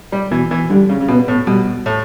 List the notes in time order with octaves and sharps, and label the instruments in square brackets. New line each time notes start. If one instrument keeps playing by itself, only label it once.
[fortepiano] G3
[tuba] B2 [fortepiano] E3
[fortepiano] E3
[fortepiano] D3 [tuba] G3
[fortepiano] C#3
C#3
[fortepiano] B2 [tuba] B3
[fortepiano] A2
[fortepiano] B2 [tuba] G3
[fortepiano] A2